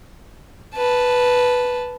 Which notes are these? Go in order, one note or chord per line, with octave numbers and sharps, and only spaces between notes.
B4 A5